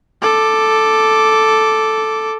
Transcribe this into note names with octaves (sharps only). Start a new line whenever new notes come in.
A4 D6